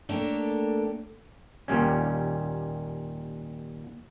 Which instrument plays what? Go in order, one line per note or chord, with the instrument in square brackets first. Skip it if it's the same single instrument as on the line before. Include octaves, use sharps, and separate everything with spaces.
[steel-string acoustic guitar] A3 A#3 D4 G4 A4 C#5
[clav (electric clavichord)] D#2 A#2 G3 C#4